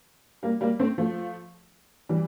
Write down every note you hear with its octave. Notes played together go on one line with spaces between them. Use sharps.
G3 A#3
G3 A#3
A3 C4
F3 A3
E3 G3